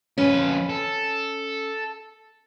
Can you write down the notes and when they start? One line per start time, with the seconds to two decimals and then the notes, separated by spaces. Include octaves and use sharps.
0.18 F2 C#4 B4
0.69 A4